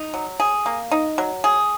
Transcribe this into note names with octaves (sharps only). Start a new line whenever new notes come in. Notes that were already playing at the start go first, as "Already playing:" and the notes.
Already playing: D#4
F#3
G#4
A#3
D#4
F#3
G#4